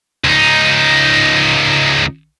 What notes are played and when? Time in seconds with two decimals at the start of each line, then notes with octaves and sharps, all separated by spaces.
0.24 C#2 D#4